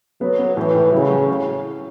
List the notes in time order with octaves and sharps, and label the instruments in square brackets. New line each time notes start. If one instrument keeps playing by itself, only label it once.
[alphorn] F#3 [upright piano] B3
[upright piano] B3
[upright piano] A2 [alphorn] E3
[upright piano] A2
[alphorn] C#3 [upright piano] F#3
[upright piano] F#3
C#4